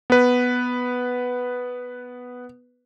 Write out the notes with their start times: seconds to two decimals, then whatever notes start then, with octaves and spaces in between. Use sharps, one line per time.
0.10 B3 B4